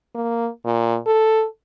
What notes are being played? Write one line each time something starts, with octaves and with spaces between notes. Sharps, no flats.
A#3
A#2
A4